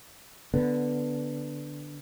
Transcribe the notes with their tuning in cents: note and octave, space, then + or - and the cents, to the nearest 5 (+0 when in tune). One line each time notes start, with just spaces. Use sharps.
D3 +0 B3 +0